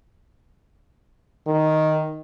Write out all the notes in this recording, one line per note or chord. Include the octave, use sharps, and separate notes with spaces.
D#3